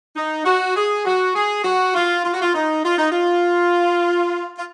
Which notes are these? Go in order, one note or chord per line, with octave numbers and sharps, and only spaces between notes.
D#4
F#4
G#4
F#4
G#4
F#4
F4
F4
F#4
F4
D#4
F4
D#4
F4
F4